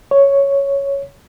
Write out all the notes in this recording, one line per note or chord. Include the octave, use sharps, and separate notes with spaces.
C#5